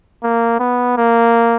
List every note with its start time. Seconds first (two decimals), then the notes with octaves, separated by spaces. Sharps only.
0.23 A#3
0.60 B3
0.97 A#3